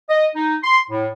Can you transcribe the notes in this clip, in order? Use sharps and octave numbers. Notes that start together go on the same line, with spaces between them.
D#5
D#4
C6
A2